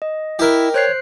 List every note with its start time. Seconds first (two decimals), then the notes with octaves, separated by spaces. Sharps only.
0.02 D#5
0.39 E4 G4 A#4
0.74 C5 C#5 F#6 C7